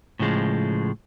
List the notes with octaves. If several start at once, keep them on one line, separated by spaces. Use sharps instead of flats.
A2 C#3 F3 G#3